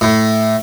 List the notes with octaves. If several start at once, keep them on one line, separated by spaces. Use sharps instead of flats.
A2